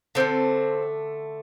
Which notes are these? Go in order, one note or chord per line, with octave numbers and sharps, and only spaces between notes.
D3 A3 C4